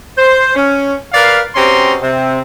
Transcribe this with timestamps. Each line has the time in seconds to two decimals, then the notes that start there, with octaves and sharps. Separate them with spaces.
0.18 C5
0.55 C#4
1.13 A#4 B4 D5 F5
1.55 B2 C4 C#4 G4 A#5 C6
2.01 C3 C4